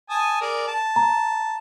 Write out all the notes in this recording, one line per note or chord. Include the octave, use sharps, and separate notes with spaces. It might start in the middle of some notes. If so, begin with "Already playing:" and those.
G#5 A5 D#6
G#4 A#4 D5
A5
A#5